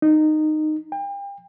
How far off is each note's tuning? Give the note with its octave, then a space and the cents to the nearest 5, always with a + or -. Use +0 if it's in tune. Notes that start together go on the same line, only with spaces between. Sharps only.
D#4 -15
G5 +35